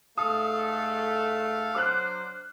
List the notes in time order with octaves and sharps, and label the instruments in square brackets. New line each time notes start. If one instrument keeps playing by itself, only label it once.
[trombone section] G#2 A3 [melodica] A4 F5 [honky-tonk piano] D#6
[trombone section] F#3 D4 C5 [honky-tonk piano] D6 F6 F#6